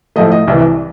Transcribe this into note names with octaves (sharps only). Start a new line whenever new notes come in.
A2 F3 A3 D#5
D#5
C2 C3 E3